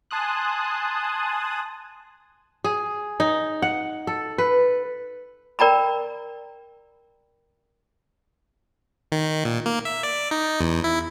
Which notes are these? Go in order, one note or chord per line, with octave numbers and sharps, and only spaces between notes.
G#5 A5 C6 D#6 F#6
G#4
D#4
F#5
A4
B4
A#4 D5 G5 A#5 B5
D#3
A#2
A#3
E5
D5
D#4
E2
E4